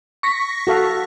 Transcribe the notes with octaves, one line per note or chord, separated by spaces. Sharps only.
C#6 A#6 B6
F#4 A4 F5